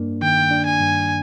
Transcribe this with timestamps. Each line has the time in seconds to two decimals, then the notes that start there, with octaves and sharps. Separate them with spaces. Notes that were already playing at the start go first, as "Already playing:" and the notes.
Already playing: G2 A#3 D4
0.22 D#3 G5
0.51 D4
0.66 G#5
0.80 G2